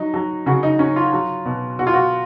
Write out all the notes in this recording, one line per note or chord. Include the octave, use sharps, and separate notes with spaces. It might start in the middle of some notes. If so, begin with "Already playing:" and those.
Already playing: F#3 D#4
F#3
C#3 F#4
D#4
F#3 C#4
F4
F#3
B2
B2 F#4
F4
F#4